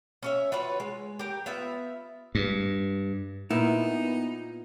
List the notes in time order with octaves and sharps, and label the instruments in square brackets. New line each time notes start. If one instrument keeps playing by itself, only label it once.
[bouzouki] C#4 C#5 E5
F4 F#4 B4 C#5
G#3
G4 A#4
B3 F4 E5
[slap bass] G2
[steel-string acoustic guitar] A#2 [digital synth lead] B3 [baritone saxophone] D#4 [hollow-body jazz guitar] E4